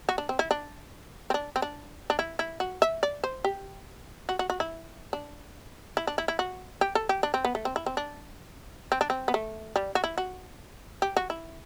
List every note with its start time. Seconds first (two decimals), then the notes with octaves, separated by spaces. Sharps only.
0.09 F#4
0.18 D4
0.29 C4
0.39 E4
0.51 D4
1.30 C4
1.34 D4
1.56 C4
1.62 D4
2.10 D4
2.19 E4
2.39 E4
2.60 F#4
2.82 E5
3.03 D5
3.24 C5
3.44 G4
4.29 F#4
4.39 F#4
4.50 F#4
4.60 E4
5.13 D4
5.97 E4
6.07 D4
6.18 E4
6.28 E4
6.39 F#4
6.81 G4
6.95 A4
7.09 G4
7.23 D4
7.34 C4
7.45 B3
7.55 A3
7.65 C4
7.76 E4
7.86 C4
7.97 D4
8.92 C4
9.01 D4
9.10 C4
9.28 B3
9.34 A3
9.76 G3
9.95 F#4
10.04 E4
10.18 F#4
11.02 G4
11.17 F#4
11.30 E4